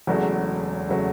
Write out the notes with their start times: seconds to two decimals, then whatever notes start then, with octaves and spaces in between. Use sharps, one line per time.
0.07 E1 E2 C#3 F#3 A3
0.89 C#3 F#3 A3